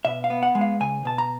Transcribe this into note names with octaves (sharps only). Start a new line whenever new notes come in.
B2 E5
F5
B3
F#5
G#3
F5
C#2 G#5
B2 A5
A#5